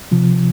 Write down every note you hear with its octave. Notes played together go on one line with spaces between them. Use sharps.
C3 F3